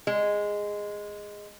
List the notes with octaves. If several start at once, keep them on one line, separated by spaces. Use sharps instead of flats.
G#3